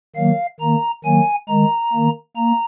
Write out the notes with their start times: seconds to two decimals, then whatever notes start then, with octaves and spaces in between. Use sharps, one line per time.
0.15 D#3 F#3 A#3 F5
0.60 D#3 A#3 A#5
1.04 D#3 F#3 A#3 G#5
1.48 D#3 G#3 A#5
1.93 D#3 A#3
2.37 A#3 A#5